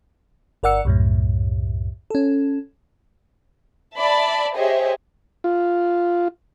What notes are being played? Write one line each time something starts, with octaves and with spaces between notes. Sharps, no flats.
G1 A#4 D5 F#5 E6 C#7
C2 F#2 A2
C#4 A4
D5 E5 A5 B5
G4 G#4 C5 C#5 D#5 E5
F4